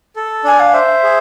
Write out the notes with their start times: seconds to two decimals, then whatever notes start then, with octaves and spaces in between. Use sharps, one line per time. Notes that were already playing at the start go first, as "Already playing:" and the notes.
0.16 A4
0.44 D4 G#5
0.60 F5
0.73 C5 E5
1.03 G#4